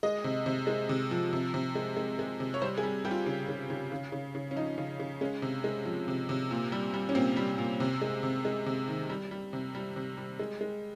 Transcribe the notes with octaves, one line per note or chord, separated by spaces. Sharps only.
G#3 D#5
C3
C3
G#3
C3
F3
C3
C3
G#3
G#3
G#3
C3
C#5
G3 C5
G#4
G3
G3 G4
F4
C#3
C#3
C#3
C#3
C#3
C#3
C#4
F3 D#4
C#3
C#3
G#3 C#4
C3
G#3
F3
C3
C3
A#2
G3
G3
C#4
A#2 C4
G3
A#2
C3
G#3
C3
G#3
C3
D#3
G3
G3
C3
G3
C3
G3
G#3
G#3